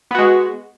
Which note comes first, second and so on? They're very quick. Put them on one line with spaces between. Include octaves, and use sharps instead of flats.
B3 F#4 G#3